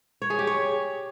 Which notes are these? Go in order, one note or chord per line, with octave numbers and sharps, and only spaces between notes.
C#5
G#4
G4
C#5